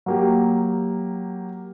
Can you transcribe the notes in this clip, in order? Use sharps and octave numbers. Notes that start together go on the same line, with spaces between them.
F#3 A#3 G4